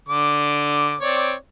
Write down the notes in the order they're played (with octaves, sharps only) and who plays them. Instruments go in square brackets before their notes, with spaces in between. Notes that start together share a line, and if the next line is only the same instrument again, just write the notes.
[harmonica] D3 D6
C4 C#5 D5